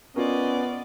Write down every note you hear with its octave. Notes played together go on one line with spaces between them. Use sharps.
B3 C#4 F4 A#4 D5 D#5